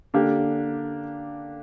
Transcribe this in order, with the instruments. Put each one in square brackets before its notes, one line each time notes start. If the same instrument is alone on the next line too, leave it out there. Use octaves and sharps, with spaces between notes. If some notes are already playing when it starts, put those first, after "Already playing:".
[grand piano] D3 A#3 D4 G4